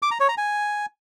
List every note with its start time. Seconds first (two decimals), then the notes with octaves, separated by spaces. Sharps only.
0.02 D6
0.11 A#5
0.20 C#5
0.29 A#5
0.38 G#5